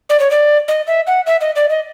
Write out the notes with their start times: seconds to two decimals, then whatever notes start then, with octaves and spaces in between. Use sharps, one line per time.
0.10 D5
0.20 C#5
0.31 D5
0.68 D#5
0.87 E5
1.07 F#5
1.26 E5
1.41 D#5
1.56 D5
1.70 D#5